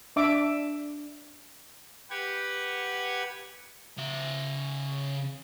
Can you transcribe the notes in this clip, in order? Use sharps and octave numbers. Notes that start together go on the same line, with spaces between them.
D4 E5 D6
G4 B4 F#5 G#6
C#3 E5